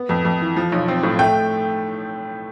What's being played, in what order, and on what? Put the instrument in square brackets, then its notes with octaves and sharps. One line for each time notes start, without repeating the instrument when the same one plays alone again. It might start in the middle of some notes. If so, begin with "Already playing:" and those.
Already playing: [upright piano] B3
F2
F2
E3
F3
B1
C4
A2
A3 G5